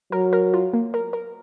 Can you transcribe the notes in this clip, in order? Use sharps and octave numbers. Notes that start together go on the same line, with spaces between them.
F#3 A#4
A#4
F4
A#3
A#4
A#4